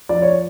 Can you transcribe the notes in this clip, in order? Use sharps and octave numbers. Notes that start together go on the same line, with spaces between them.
F3 D5
C#5